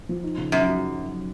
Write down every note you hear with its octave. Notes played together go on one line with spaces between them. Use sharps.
F3
D#4
C#3
F#2 C#3
F#3